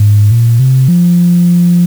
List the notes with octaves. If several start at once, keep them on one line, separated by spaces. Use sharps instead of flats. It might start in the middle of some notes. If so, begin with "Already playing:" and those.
Already playing: G#2
A#2
C3
F3